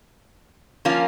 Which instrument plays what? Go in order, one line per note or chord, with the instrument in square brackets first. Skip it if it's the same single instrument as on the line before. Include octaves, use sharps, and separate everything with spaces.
[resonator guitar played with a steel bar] F3 A#3 C#4 F4